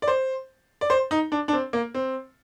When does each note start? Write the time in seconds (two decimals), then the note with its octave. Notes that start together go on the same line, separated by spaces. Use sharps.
0.02 D5
0.08 C5
0.81 D5
0.90 C5
1.11 D#4
1.32 D4
1.48 D4
1.53 C4
1.73 A#3
1.94 C4